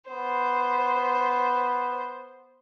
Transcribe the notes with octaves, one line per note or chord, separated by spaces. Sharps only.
B3 C5